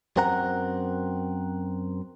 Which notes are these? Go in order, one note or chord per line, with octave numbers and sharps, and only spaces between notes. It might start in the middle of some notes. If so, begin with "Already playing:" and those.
F#2 C4 A#4 F#5 A#5